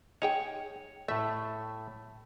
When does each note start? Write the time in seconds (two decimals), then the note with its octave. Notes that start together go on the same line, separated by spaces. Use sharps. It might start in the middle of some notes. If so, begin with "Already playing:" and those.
0.22 D#4 G#4 C#5 G5
1.08 A2 A3 E5